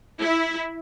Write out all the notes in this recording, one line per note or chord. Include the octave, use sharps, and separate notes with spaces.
E4